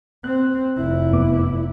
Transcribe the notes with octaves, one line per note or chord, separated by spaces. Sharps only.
C4 F#6
F1 E4
F#2 B3 D6